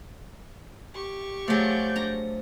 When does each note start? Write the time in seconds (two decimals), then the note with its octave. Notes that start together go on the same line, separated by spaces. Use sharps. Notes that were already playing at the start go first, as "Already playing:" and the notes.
0.94 G4 C#6
1.48 F3 F#3 A3 G#4 D5 G6
1.96 D4 A#5